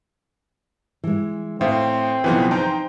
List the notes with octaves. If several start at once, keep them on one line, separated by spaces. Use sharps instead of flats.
E3 G#3
A2 C4 C5 E5 F5
B1 C#3 E3 F3 B3 B4
D#4 C5 G5 A#5